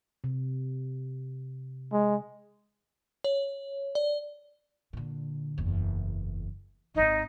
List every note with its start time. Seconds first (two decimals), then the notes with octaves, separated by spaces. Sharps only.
0.24 C3
1.92 G#3
3.24 C#5
3.95 D5
4.93 A#2 D3
5.58 F#1 E2
6.95 G#1 D#2 D#4